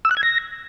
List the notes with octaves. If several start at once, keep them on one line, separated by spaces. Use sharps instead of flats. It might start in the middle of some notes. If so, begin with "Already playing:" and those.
E6
F#6
G#6
A#6